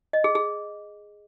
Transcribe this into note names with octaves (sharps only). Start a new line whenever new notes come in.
D#5
G#4
G#4